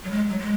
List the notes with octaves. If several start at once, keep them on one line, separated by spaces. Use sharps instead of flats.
F#3
G#3
F#3
G#3